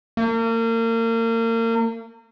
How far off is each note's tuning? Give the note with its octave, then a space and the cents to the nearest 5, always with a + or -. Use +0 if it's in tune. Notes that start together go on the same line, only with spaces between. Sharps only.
A#3 -35